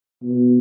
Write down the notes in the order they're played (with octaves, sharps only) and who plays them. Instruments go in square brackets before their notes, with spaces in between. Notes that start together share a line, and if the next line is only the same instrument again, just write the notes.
[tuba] B2